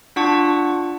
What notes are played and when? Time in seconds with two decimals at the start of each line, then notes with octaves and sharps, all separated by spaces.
0.16 D4 F4 F#5 A5 C#6